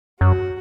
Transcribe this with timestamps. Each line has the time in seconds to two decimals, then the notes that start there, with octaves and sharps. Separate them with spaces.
0.20 F#2 F#4